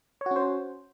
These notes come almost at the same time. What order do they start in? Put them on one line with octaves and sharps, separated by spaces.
C#5 F#4 C#4 C5